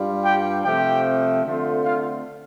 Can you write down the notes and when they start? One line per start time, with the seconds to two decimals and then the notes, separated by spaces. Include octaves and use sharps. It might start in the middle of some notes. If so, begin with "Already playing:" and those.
Already playing: G2 G3 D4 F4
0.24 G4 G5
0.64 C3 F3 A3 C4 G4 G5
1.44 D3 A3 C4 F4
1.83 F4 F5